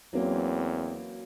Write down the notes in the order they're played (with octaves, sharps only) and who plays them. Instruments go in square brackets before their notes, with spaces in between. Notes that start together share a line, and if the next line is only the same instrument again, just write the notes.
[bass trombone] E2 [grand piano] F#3 A#3 C#4 [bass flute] C4